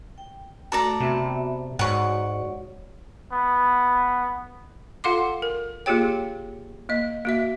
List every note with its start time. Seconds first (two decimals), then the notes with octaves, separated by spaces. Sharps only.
0.18 G5
0.72 A3 F#4 A4 D5 A#5
1.00 C3 B3 F#4 E5
1.79 G#2 F#4 C#5 D5 F#5 C#6
3.32 B3
5.04 F4 A4 F5 F#5 C6 D6
5.42 A#4
5.86 A#3 F4 G4 G#4 C#5 G5
6.89 A#3 D#5
7.25 A#3 F#4 E5